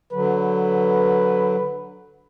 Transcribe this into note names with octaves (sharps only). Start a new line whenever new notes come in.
D3 F#3 B4